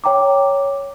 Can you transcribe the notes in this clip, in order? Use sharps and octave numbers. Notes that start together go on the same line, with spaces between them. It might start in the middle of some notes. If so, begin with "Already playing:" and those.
C#5 G5 A#5 D6